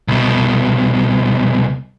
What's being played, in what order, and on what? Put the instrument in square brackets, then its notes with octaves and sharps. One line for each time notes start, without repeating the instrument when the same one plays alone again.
[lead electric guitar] C2 B2